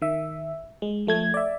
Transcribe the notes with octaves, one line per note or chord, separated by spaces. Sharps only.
D#3 E5
G#3
F3 A3 G#6
D5 E5